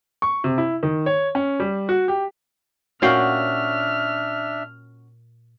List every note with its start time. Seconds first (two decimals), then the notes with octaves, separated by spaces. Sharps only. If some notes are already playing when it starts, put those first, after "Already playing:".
0.22 C#6
0.44 C3
0.58 E4
0.83 D#3
1.06 C#5
1.35 C#4
1.60 G3
1.89 F#4
2.08 G4
3.02 A#2 C#4 D4 F#4 E5 F5 G5 F6